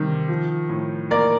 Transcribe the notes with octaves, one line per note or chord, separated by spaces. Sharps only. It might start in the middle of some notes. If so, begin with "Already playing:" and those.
Already playing: C3 D#3 G3
F3
A2
A#3 A#4 D5